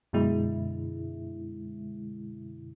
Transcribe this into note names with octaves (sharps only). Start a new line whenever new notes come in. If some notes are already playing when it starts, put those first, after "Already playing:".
F#2 B2 D3 G#3 E4